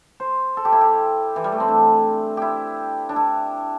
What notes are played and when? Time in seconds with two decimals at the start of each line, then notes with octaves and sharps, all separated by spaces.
0.20 C5
0.57 A4
0.65 G4
0.72 E4
0.81 G4
1.36 E3
1.44 G3
1.52 A3
1.60 C4
1.68 D4
2.37 E4 G4
3.09 D4
3.16 E4